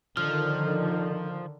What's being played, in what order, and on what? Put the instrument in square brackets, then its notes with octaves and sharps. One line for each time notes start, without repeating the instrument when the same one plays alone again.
[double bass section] D3 D#3 [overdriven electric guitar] F3 [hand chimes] F6